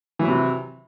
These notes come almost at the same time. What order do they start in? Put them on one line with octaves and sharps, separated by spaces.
E3 F#3 E4 C3